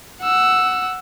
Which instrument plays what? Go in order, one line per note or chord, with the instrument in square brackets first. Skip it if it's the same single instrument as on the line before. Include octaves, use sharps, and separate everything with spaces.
[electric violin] F#5 E6